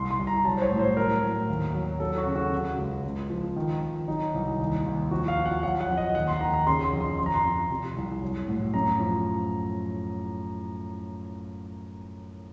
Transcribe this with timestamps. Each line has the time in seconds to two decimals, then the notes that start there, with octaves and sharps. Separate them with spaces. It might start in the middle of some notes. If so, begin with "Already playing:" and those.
Already playing: C2 C6
0.11 C6
0.19 C2
0.27 A#5
0.45 F#3 A5
0.57 C5
0.62 C#5
0.70 A2
0.79 C5
0.97 F#3 A#4
1.23 A2
1.48 D#2
1.74 F#3
2.00 F#3 A4
2.17 F#4
2.26 C#3
2.35 F#4
2.52 C#3
2.78 C#2
3.05 C#2
3.30 F3
3.56 D#3
3.81 D#3
4.08 F#3 D#4
4.34 C2
4.59 D#2
4.86 D#2
5.11 F3 F#4
5.28 F5
5.37 F3
5.46 F#5
5.63 F#3 F#5
5.81 F#5
5.89 F2
5.97 D#5
6.15 D#2 F#5
6.28 C6
6.41 D#3 A#5
6.54 A#5
6.67 C#3 C6
6.84 C6
6.93 F2
7.01 C6
7.19 F2 C6
7.26 A#5
7.34 C6
7.45 F2
7.70 C3
7.96 C2
8.22 F#3
8.48 A2
8.74 F#2 A#5
8.99 F3